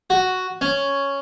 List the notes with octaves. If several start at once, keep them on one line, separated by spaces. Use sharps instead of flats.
F#4
C#4